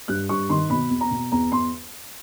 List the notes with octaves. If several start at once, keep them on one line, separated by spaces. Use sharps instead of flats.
G2 F#6
G2 C#6
D#3 C6
B2 B5
E2
A#5
B2
E2 A#5
E2 C6